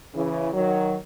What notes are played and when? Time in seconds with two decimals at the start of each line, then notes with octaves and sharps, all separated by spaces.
0.13 C#3 E3
0.53 D#3 F#3